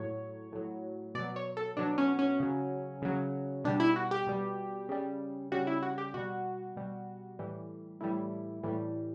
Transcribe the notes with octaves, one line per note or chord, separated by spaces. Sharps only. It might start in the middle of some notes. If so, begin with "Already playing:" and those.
Already playing: A2 F#3 C#5
A2 F#3
B2 F#3 D5
C#5
A4
B2 F#3 D4
C#4
C#4
C#3 F#3
C#3 F#3
B2 G3 D4
E4
F#4
G4
B2 G3
C#3 G3
C#3 G3 F#4
E4
F#4
G4
B2 G3 F#4
B2 G3
A2 E3 G3
A2 E3 G3 E4
A2 E3 G3